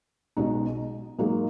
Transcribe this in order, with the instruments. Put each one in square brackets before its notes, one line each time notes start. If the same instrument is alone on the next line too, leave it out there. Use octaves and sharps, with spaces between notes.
[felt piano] B1 B2 G#3 D#4
G#2 F#3 A#3 D#4 G#4